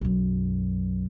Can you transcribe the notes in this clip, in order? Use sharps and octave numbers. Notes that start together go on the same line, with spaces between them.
B1 F#2